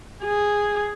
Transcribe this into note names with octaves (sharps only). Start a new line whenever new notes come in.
G#4